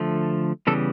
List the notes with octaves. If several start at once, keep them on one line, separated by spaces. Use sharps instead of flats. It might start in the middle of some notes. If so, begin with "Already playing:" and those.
Already playing: D3 F3 A3
C#3 E3 G3 B3 A4